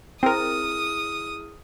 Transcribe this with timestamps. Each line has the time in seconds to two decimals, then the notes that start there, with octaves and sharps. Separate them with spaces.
0.23 C4 E4 G#4 A#4 D#6 F6